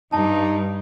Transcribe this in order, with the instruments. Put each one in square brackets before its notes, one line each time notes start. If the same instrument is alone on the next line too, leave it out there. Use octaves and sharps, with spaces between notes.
[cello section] G2 [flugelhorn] D#4 [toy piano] A5